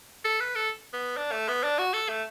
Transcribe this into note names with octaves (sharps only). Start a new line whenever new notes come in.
A4
B4
A4
B3
D4
A3
B3
D4
F#4
A4
A3